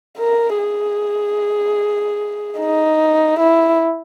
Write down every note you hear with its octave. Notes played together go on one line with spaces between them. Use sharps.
A#4
G#4
D#4
E4